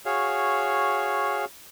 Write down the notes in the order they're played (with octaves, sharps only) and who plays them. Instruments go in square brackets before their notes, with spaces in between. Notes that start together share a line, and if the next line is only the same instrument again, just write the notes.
[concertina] F#4 G#4 C#5 F5